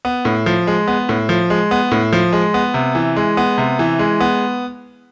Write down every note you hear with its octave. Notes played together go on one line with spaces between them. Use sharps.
B3
A2
F3
G#3
B3
A2
F3
G#3
B3
A2
F3
G#3
B3
C3
E3
G#3
B3
C3
E3
G#3
B3